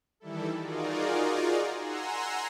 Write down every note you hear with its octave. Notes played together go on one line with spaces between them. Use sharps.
D#3 E3 G3 E4 A4
D#4 F4 F#4 G#4 A#4 D5
F#5 G#5 A#5 C6 E6